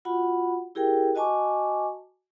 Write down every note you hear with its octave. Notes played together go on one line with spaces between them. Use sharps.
F4 F#4 F#5 B5
E4 G4 G#4 A#4 G5
F#4 D#5 G#5 A5 C#6 D6